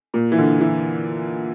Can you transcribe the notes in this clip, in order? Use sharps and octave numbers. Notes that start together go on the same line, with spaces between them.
A#2
E3
D3
E3